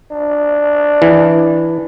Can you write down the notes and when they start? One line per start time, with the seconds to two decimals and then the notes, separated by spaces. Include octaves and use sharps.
0.11 D4
1.02 E3